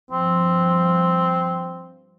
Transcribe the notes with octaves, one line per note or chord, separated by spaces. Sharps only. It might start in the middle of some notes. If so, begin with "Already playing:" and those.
G2 F3 C4